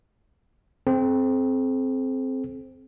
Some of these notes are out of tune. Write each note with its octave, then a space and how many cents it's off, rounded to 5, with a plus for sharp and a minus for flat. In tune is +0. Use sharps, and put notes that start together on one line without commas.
C4 +0 A4 -45